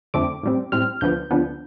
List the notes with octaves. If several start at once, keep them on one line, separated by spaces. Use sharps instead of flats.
F2 D3 A3 C4 D6
A2 G3 C4
A2 G3 C4 F6
D2 D3 F3 B3 G6
D2 D3 F3 B3